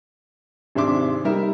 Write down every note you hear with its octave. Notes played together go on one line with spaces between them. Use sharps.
G#1 C3 D4 E5 C6 D6
G3 D#4 A#4 E5